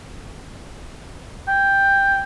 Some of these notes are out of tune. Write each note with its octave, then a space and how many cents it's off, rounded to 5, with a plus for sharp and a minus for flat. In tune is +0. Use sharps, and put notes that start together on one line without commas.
G5 +10